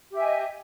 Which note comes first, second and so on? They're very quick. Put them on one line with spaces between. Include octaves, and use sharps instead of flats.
G4 E5 G#5 D#5